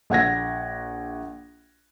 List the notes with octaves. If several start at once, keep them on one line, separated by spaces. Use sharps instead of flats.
A#1 F#5 G#6 A#6